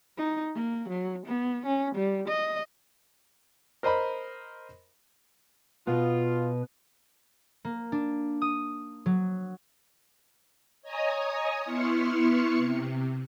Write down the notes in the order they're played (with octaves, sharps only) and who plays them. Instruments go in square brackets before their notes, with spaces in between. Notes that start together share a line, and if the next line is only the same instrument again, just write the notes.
[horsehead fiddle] D#4
A#3
F#3
B3
C#4
G3
D#5
[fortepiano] A#4 C5 D#5 A#5 B5
[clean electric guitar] B2 B3 [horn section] F4
[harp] A#3
D4
D#6
F#3
[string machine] C#5 D#5 G#5 A#5 D#6
B3 E4 C6 C#6 F6 C#7
C3